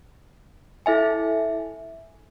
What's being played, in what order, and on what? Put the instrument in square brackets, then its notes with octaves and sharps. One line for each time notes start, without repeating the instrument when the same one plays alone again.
[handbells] E4 A4 E5 G#5